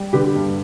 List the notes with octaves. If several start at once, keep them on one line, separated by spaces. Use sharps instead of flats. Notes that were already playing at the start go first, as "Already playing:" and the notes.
Already playing: G3
D3 G4 B4
G2